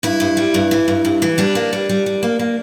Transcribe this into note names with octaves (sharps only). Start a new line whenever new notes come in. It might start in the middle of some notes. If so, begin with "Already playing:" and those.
G2 E4
G2
G3
G2
E3
G2
G2
E3
G3 D4
A#3
G3
G3
G3
A#3
A#3